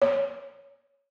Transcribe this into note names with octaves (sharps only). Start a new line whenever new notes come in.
C#5